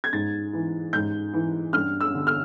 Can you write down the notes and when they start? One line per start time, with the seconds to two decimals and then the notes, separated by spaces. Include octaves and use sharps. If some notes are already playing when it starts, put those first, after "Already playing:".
0.04 G#6
0.13 G#2 A6
0.53 E3
0.93 G#2 G6
1.34 E3
1.73 G2 F6
2.00 E6
2.14 D3
2.27 F6